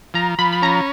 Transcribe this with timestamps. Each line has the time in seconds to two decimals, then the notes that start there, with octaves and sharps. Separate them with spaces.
0.14 F3 A#5
0.39 F3 B5
0.53 B5
0.62 C#4 A#5